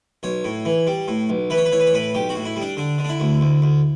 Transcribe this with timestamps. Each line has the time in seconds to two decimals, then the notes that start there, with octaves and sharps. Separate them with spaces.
0.23 B1 C#5
0.45 A2
0.65 E3
0.87 G3
1.08 A2
1.29 B1
1.50 E3 B4
1.57 C#5
1.65 B4
1.72 E3 C#5
1.80 B4
1.87 C#5
1.93 A2 B4
2.14 B1 G4
2.29 F#4
2.36 A2
2.45 E4
2.56 G3
2.62 D4
2.77 D3 D4
2.98 D3
3.05 D4
3.09 E4
3.20 D2
3.41 D2
3.62 D2